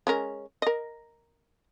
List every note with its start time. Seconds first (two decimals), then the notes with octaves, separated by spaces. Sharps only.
0.07 G#3 C#4 A#4
0.62 A#4 D#5